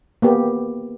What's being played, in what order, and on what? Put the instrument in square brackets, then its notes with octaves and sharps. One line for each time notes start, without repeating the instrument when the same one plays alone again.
[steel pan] A#3 B3 G4